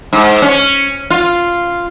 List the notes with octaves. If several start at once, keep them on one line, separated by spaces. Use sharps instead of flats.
G#2
C#4
F4